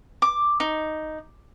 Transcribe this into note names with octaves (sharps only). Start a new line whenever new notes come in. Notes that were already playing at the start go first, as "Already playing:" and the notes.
D6
D#4